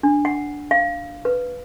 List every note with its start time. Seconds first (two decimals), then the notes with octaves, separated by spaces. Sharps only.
0.03 D4
0.25 F#5
0.71 F5
1.25 B4